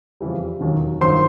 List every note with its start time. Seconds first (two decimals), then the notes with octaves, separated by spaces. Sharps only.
0.21 F2 C#3 E3 G3
0.61 E1 D#2 D#3 F#3
1.01 G1 G2 D#3 F#3 C5 C6